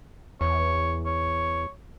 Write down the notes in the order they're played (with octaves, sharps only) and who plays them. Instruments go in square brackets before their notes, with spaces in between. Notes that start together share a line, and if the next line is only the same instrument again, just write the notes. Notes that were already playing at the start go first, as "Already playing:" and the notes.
[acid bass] E2 [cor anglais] C#5
[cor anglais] C#5